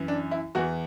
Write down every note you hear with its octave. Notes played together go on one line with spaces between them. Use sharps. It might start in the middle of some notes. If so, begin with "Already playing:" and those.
Already playing: F#2 E3
D4
E4
E2 E3 F#4